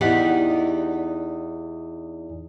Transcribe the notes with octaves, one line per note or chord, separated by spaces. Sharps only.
E2 D#4 G4 D5 F#5